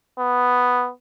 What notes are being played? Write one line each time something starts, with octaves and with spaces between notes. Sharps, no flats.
B3